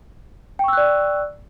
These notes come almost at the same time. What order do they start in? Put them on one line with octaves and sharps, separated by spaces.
G5 C#6 E6 F#6 D5